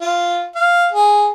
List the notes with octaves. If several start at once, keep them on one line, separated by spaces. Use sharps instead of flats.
F4
F5
G#4